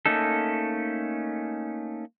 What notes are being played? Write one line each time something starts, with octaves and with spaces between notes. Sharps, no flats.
A3 A#3 C#4 D#4 A4